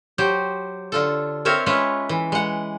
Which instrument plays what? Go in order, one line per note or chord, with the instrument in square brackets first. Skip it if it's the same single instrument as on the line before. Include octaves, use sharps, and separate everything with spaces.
[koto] F#3 G4 C5
D3 F4 A4
C4 A#4 C#5 E5 F5
G#3 C#4 F4 B4 C#5 E5
E3
G#3 F#5